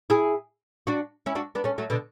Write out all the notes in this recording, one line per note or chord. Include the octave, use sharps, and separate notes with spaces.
E4 G#4
D4 F#4
C#4 E4
D4 F#4
B3 D4
A3 C#4
F#3 A3
B2 D3